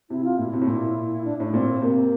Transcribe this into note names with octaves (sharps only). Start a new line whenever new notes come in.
C3 E4
F4
A#2 E4
C3
A2
A#2
D4
A2 D4
A#2 C4
C3 A#3